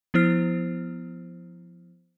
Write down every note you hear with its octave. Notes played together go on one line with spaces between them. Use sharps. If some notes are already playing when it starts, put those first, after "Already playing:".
F3 B3 E4 C5 F6 C7